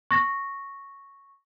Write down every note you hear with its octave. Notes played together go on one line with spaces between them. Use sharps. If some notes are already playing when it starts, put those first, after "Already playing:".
C#6 A#6